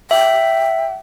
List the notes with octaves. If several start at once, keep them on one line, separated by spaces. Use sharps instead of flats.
E5 G5